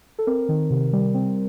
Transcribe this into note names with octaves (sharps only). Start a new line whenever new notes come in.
A4
C4 A#4
D#3
C3
G3
C4